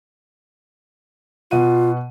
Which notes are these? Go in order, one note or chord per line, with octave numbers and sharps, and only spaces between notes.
B2 F4 F#5 D#7